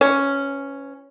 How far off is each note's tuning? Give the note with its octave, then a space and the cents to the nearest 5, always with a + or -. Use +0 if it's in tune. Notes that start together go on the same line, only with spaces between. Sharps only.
E3 +35 C#4 +0 C#5 +0